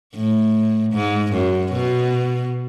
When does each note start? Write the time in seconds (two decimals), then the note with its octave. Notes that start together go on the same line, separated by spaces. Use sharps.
0.15 A2
0.94 G#2
1.33 F#2
1.73 B2